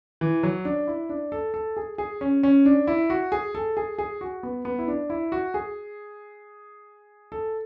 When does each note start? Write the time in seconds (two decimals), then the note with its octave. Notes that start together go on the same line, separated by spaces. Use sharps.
0.21 E3
0.43 F#3
0.65 D4
0.87 E4
1.09 D4
1.32 A4
1.54 A4
1.76 G#4
1.98 G#4
2.21 C#4
2.43 C#4
2.65 D4
2.87 E4
3.10 F#4
3.32 G#4
3.55 A4
3.77 G#4
3.98 G#4
4.21 F#4
4.43 B3
4.65 B3
4.78 E4
4.88 D4
5.10 E4
5.32 F#4
5.54 G#4
7.32 A4